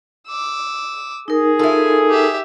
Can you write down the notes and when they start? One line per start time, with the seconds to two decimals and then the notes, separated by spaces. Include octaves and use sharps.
0.28 D6 E6
1.28 D#4 G#4 A#4
1.59 E4 F4 A4 G#5
2.10 G4 E5